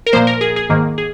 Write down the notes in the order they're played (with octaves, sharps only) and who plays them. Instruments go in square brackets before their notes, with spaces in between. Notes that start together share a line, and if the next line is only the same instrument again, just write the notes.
[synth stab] A#4
A#2 F3 A#3 C5
A#4
G#4
G#4
G#2 D#3 A#3
G#4